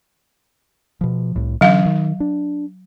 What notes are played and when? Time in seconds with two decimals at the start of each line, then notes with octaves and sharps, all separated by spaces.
1.01 B2 F3
1.36 C2 A2
1.61 D3 E3 F#3 C#4 F5
1.86 D#3
2.20 D4